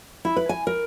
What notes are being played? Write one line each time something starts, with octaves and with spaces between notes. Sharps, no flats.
E4
B4
G#5
A#4